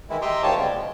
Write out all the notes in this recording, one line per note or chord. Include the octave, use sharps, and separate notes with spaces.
D#3 E3 G#3 E4
G4 D#5 E5 G5 A#5 C6
D2 D#3 F4 G4 C#5 A5
C#3 G3 G#3 B3 C4
B2 G#3